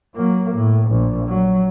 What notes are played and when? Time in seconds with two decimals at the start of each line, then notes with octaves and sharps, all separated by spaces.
0.15 F#3 A#3
0.54 A2
0.91 A#1
1.28 F#3